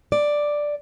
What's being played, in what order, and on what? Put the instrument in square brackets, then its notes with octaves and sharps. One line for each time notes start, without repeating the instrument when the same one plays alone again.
[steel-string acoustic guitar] D5